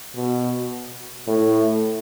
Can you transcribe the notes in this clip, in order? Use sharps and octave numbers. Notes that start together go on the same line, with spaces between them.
B2
A2